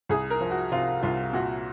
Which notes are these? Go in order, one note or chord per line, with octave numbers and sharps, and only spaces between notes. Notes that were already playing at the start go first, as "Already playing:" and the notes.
C2 G#4
A#4
F3
F#4
C3 F4
C2 F4
A#2 F#4